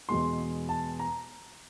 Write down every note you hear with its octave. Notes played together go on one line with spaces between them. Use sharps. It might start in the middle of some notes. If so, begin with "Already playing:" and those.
E2 B2 G#3 C6
A5
A#5